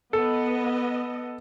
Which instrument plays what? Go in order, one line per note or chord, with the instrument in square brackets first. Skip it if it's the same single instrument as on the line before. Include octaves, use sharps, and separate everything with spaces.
[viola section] B3 D#5 [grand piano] A4